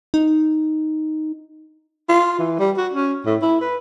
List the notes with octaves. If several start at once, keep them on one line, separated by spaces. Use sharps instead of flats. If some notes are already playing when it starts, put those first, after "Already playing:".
D#4
F4
E3
G3
F#4
C#4
A2
E4
B4